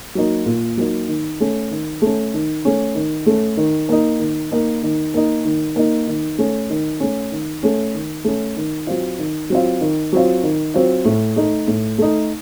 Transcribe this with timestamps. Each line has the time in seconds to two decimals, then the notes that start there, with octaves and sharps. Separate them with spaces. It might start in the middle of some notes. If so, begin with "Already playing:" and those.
0.15 F#3 A#3 D#4
0.46 A#2
0.77 F#3 A#3 D#4
1.08 D#3
1.40 A3 C#4
1.71 D#3
2.02 A3 C#4
2.34 D#3
2.65 A3 C#4
2.95 D#3
3.26 A3 C#4
3.57 D#3
3.89 A#3 D#4
4.20 D#3
4.51 A#3 D#4
4.83 D#3
5.14 A#3 D#4
5.45 D#3
5.76 A#3 D#4
6.08 D#3
6.38 A3 C#4
6.70 D#3
7.00 A3 C#4
7.32 D#3
7.63 A3 C#4
7.94 D#3
8.24 A3 C#4
8.57 D#3
8.87 F#3 C4 F4
9.19 D#3
9.50 F#3 C4 F4
9.81 D#3
10.13 F#3 C4 F4
10.43 D#3
10.74 F#3 C4 F4
11.05 A2
11.36 A3 D#4
11.68 A2
11.98 A3 D#4